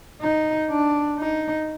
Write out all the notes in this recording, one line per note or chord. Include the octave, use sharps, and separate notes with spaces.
D#4
D4
D#4